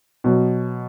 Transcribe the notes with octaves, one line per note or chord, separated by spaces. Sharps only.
B2 F#3